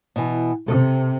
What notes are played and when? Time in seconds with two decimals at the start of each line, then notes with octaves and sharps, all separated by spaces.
0.16 B2 E3
0.68 C3 A4